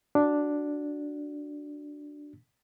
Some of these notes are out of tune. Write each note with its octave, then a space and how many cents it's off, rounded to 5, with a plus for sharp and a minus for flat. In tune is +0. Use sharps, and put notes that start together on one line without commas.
D4 +0 F#4 +0